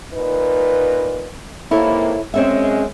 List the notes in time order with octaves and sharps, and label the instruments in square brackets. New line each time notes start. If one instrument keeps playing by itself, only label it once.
[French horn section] A#2 D#4 B4
[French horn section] G#2 C3 A#3 [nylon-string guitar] E4 A4 C#5
[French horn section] F#2 G#3 [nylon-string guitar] C4 C#4 E5